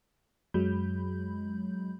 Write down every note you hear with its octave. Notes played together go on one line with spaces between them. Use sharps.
F#2 F#3 G#3 B5 G6